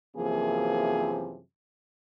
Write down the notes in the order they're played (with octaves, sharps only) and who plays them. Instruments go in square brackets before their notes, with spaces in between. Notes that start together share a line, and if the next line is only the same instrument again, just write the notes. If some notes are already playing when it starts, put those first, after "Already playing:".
[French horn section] F#2 C3 E3 F3 A#3 G#4